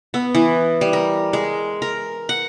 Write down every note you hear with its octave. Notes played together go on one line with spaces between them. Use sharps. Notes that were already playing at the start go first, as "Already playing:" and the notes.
B3
E3
G3
A#4
G#3
A#4
F#5